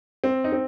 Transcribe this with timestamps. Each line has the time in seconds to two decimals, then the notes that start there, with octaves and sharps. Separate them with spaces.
0.24 C4
0.44 D#4
0.52 C4